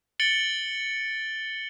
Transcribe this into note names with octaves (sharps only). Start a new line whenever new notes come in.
A6 C#7 D7 F#7 G7